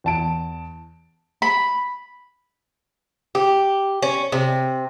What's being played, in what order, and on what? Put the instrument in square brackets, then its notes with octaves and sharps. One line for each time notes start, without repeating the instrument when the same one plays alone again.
[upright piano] E2 A5 D7
[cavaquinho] B5
[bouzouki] G4
C#4
C3